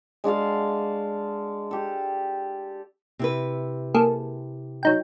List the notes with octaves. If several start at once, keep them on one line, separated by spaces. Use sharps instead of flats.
G#3 D4 F#4 F5
G4 A4
C3 E4 B4
A#3 G#4 A4
F#3 D#4 G5